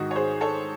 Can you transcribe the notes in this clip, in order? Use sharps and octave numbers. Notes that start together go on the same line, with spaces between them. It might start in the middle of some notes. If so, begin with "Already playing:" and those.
Already playing: G#2 D#3 D#4 F#4
C#5
G#4 C5
A4 C#5